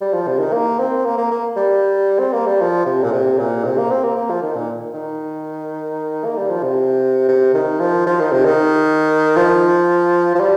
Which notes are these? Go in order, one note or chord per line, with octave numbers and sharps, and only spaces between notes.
G3
F3
C3
D#3
A#3
C4
A#3
A#3
A#3
G3
C4
A#3
G3
F3
C3
A#2
C3
A#2
C3
A#3
C4
A#3
A#3
F3
D#3
A#2
D#3
A#3
G3
F3
C3
C3
D#3
F3
F3
D#3
C3
D#3
F3
F3
G3